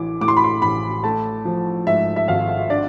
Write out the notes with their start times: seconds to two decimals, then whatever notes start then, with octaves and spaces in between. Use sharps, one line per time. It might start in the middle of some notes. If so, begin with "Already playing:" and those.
Already playing: A1 E3 D6
0.21 A2 D6
0.28 C6
0.37 B5
0.44 C6
0.62 A1 B5
1.03 A3 A5
1.45 F3
1.87 G#2 E5
2.16 E5
2.28 G#1 F5
2.70 D4 D5